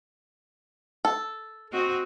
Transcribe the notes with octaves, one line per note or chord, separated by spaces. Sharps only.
A4
C4 F#4 D#5